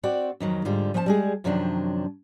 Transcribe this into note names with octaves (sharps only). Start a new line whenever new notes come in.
C4 F#4 D5 G5
F2 D#3 F#3
G#2 D3 G3 F4
F3 C#4 C5 G5 A5
G3 G#3 G#4
F#2 C3 D#3 F3 F#3 D4